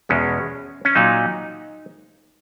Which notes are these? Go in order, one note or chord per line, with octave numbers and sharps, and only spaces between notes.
E2 B2 G#3 C#4
C#4
A#2 F#3 D#4